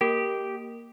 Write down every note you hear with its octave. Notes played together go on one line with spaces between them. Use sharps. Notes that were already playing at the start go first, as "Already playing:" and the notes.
A#3 G4 A#4